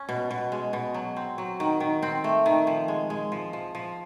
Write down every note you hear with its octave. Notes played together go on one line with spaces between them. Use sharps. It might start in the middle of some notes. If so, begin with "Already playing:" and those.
Already playing: C#4
B2
B2
G#3
B2
F#3
C4
F#3
D#3
D#3
C4
A3
D#3
F3
G#3
G#3
F3
F3
F3